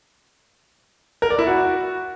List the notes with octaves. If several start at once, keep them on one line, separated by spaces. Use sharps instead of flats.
A#4
D5
E4
F#4